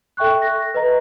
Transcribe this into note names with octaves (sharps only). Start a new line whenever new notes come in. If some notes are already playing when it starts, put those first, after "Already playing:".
A4 E5 G5 C#6 F#6
A#6
B4 D#5 A#5